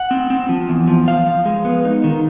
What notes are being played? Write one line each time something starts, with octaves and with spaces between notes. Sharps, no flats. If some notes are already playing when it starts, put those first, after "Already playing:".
Already playing: F#5
C4
C4
F3
E2
F3
F3 F5
F3
G#3
B3
D#4
D#3